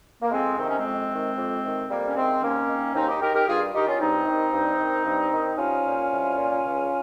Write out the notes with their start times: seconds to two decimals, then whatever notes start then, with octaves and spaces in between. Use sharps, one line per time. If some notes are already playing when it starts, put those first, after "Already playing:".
0.22 A#3
0.31 F2 G#3 C4
0.58 C3 D#3 C4
0.68 C#4
0.77 G#3 C4
0.84 F2
1.11 C3 D#3
1.38 F2
1.63 C3 D#3
1.90 F2 G3 A#3
2.07 C#4
2.16 C3 D#3 G#3 C4
2.42 D#2 A#3 C#4
2.69 D#3
2.94 D#2 C4 D#4
3.07 D#4 G4
3.22 D#3 G4 A#4
3.34 G4 A#4
3.47 G2 F4 G#4
3.73 D#3 D#4 G4
3.87 C#4 F4
4.00 G2 C4 D#4
4.26 D#3
4.52 G2
4.80 D#3
5.05 G2
5.32 D#3
5.57 C2 C#4 F4
5.85 A#2
6.11 C2
6.37 A#2
6.64 C#2